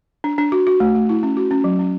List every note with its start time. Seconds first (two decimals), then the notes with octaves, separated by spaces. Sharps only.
0.24 D4
0.38 D4
0.52 F#4
0.67 F#4
0.80 A3
0.95 A3
1.09 E4
1.23 C#4
1.37 F#4
1.51 C#4
1.64 F#3
1.79 C#4